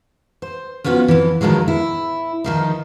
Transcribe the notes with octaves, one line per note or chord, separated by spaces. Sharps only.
C5
F3 B3 C#4 F4 F#4
F2 E3
G2 D#3 F3 F#3 G#3
E4
D#3 F3 D#4